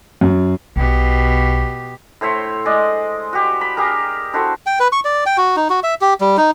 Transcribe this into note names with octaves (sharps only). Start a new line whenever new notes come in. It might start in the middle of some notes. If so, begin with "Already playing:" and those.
F#2
B1 B2 G4
A2 C5 C#5 E5
G#3 D5 D#5
F#4 G4
B5
G4 G#4 A#4
E4 F#4 A4 C5
G5
B4
C#6
D5
G5
F#4
D#4
F#4
E5
G4
G3
D#4